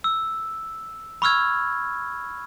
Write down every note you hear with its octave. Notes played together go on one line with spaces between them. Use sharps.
E6
B5 C#6 E6 F6 G#6